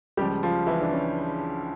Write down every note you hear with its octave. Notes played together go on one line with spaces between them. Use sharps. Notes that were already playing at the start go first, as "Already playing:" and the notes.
C#2 C#3 F3 G3 G4
F3 F4
E3 E4
D4
C#4